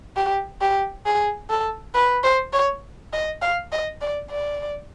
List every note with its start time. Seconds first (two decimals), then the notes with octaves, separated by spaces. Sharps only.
0.16 G4
0.61 G4
1.06 G#4
1.50 A4
1.95 B4
2.24 C5
2.53 C#5
3.13 D#5
3.42 F5
3.72 D#5
4.01 D5
4.31 D5